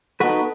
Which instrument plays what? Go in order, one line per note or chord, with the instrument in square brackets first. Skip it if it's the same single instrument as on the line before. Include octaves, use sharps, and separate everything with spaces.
[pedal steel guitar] B3 D#4 F#4 B4 [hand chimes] A4